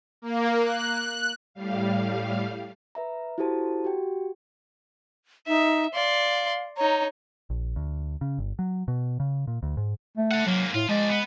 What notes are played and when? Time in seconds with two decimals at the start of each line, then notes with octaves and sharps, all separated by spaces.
0.22 A#3
0.60 F#6
1.54 A2 G3 F5
2.95 B4 E5 A#5
3.38 E4 F#4 G4 A4 C5 A5
3.84 F#4 G4 G5
5.47 D#4 E5
5.94 D5 F5 C6
6.77 D#4 C#5 A#5
7.50 A#1
7.76 D2
8.21 C#3
8.39 G1
8.59 F#3
8.88 B2
9.20 C#3
9.47 A#2
9.63 D2
9.77 G#2
10.17 A3
10.31 A4 F#5
10.46 G#2 F#3 A#3
10.75 A2 F4
10.89 F3 G#3 D5
11.09 B3